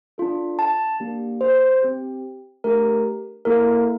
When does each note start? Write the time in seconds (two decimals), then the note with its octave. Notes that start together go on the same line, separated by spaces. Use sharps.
0.18 D4 F4 A4
0.59 A5
1.00 A#3 D4 G4
1.41 C5
1.83 C4 G4
2.64 A3 D4 G4 A#4
3.45 A#3 E4 A4 A#4